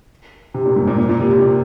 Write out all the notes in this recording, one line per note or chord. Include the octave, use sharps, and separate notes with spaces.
C3
A#2
G#2
A#2
A#2
A#2
C3
C3
A#2